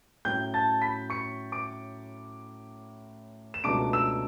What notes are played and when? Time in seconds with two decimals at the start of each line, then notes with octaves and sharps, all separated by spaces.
0.25 A2 F#3 C#4 E4 G5 G6
0.54 A5 A6
0.82 B5 B6
1.10 C#6 C#7
1.52 D6 D7
3.54 E7
3.64 C#2 B2 F#3 A3 D4 D6 D7
3.93 E6 E7